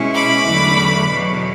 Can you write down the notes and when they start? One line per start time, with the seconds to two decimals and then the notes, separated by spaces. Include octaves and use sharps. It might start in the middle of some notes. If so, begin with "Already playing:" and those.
Already playing: B2 G#3 C#4 E4
0.13 B5 D6
0.45 E2 D3 F#3 A3
1.08 E2 B2 F#3